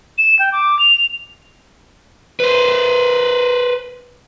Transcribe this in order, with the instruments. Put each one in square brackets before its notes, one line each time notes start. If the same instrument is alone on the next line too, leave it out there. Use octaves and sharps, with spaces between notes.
[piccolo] E7
G5
D6
F7
[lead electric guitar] B4 C5